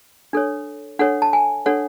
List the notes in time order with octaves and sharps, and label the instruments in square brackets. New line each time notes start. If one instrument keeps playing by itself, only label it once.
[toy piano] D4 A4 C#5
D4 A4 C#5 F#5
A5
G#5
D4 A4 C#5 F#5